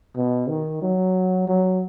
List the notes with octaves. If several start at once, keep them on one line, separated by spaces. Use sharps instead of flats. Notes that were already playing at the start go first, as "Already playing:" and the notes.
B2
D#3
F#3
F#3